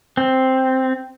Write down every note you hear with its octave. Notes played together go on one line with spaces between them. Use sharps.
C4